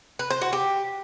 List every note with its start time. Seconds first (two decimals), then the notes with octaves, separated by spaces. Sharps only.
0.19 B4
0.30 C5
0.41 F#4
0.53 G4